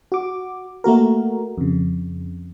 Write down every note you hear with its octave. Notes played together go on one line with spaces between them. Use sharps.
F#4 D6
A3 A#3 F#4 A#4
F2 C#3